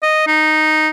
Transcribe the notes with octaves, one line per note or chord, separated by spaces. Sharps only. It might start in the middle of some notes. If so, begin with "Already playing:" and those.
D#5
D#4